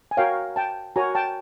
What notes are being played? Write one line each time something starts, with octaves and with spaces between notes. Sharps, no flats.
G#5
F#4 A#4 C#5 F5 G5
G5 A5
F#4 A#4 C#5 G#5 A#5
G5 A5